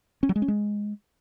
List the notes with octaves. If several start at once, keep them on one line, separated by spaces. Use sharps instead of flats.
C#4
F#3
G#3
C#4
G#3